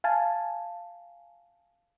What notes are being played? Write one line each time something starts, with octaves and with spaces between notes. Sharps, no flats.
F5 G#5 A5